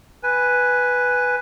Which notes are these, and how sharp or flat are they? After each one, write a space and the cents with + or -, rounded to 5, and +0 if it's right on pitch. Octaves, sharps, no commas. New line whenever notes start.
B4 +0 G#5 +0